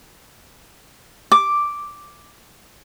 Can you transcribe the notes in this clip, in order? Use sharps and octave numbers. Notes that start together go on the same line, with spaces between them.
D6